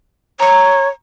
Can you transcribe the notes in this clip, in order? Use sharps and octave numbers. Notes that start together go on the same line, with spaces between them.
C#5 A#5 C#6